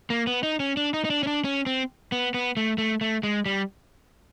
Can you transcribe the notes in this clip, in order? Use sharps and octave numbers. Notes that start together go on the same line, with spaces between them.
A#3
B3
D#4
C#4
D4
D#4
D#4
D4
C#4
D4
C#4
C4
B3
B3
A3
A3
A3
G#3
G3